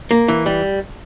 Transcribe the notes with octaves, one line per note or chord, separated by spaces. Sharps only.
A#3
E3
G3